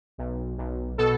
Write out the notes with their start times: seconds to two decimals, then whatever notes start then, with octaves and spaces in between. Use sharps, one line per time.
0.18 B1
0.58 B1
0.98 B2 A4